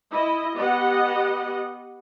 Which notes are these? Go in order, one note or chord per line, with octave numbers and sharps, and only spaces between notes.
E4 D#5
B3 G4 D#5 F#5